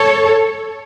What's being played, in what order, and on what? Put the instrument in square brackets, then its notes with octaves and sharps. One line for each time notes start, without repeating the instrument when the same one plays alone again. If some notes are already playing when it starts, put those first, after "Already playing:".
Already playing: [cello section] A4 C#5